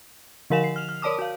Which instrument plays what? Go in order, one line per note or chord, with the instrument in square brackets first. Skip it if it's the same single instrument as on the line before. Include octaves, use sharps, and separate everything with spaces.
[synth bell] D3 F3 A#4 F5 G#5 E7
C7
F6 F7
F6
A#4 C#5 D5 A5 D6 D#6
F#4 F5